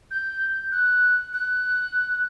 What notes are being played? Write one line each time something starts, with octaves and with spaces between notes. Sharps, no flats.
G6
F#6
F#6